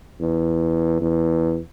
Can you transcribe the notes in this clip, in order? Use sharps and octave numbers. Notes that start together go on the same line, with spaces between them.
E2
E2